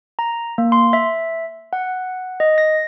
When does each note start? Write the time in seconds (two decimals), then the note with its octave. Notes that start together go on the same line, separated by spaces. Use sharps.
0.19 A#5
0.58 A#3
0.72 C6
0.93 E5
1.73 F#5
2.40 D#5
2.58 A#6